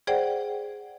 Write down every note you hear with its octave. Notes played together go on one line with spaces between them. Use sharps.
G#4 C5 D5 F#5 G5